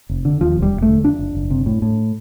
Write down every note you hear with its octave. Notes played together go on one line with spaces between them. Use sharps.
F1
D3
D#2 F3
E1
G3
E1
A3
D3
F2 D4
F#1
F#1
C3
A2
A2